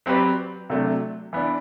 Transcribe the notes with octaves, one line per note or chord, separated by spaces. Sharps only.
F#3 C4 G4 B4 D5
C3 F#3 A3 D4
E3 B3 D4